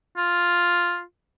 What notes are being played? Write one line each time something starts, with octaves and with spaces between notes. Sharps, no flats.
F4